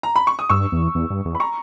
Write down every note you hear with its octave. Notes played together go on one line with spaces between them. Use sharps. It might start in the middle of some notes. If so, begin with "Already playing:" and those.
A#5
B5
C#6
D#6
G2 C#6 E6
E2
E2
G2
E2
B5
A#5 C#6